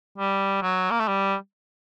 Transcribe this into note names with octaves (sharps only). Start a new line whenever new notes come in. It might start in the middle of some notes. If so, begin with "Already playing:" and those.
G3
F#3
A#3
A3
G3